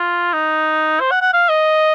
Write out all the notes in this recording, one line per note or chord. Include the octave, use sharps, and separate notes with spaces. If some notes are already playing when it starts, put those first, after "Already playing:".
Already playing: F4
D#4
C5
F#5
F#5
F5
D#5